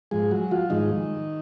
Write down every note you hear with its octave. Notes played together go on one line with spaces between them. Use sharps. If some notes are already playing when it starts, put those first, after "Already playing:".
G#2 F3 G#3 G#4
F#3 F#4
F3 F4
G#2 D#3 F3 G#3 D#4